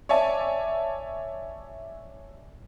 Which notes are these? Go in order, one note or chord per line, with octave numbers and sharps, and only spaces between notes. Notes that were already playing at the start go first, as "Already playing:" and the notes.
C#5 D5 E5 G#5 A5